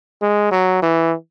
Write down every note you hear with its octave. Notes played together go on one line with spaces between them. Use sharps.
G#3
F#3
E3